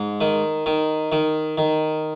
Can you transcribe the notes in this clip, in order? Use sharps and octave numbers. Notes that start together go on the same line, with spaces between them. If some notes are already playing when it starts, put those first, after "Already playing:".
Already playing: G#2
D#3
D#3
D#3
D#3